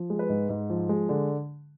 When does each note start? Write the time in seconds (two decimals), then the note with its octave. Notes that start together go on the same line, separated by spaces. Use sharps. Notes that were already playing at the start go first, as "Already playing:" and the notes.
Already playing: F3
0.10 G#3
0.19 B4
0.29 G#2
0.49 G#2
0.70 F3
0.89 G#3
1.09 D3